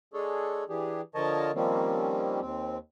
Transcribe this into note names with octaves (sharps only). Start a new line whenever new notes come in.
G#3 D4 G#4 A4 C#5
E3 D4 G4 G#4
D3 F3 A#4 C#5 D#5 A5
D#3 F3 G3 A#3 C4 C#4
D#2 C4